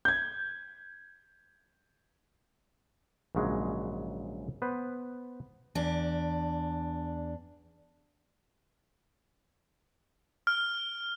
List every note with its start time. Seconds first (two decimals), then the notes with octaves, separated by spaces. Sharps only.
0.05 G6 G#6
3.35 A#1 G#2 C#3 F#3 G#3
4.62 B3 B4 C5
5.75 E2 D4
10.47 F6